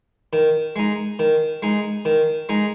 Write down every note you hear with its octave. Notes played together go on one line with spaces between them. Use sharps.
D#3
G#3 D#4
D#3
G#3 D#4
D#3
G#3 D#4